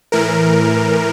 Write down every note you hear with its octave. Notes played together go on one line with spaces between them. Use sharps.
A2 E3 A#4